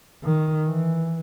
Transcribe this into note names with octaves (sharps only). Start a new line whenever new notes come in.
D#3
E3